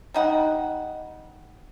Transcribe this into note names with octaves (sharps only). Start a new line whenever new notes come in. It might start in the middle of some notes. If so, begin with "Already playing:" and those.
G3 D#4 F#5